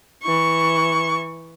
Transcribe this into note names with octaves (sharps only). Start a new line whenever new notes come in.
E3 C#6